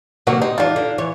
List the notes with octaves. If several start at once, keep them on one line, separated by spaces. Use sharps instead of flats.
C3 D#3 F#3 A#3 F#4
C4 D#4
E2 D4 D#4 F4
D3
E3 C#5